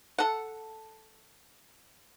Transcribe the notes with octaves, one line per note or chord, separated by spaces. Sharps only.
A4 F#5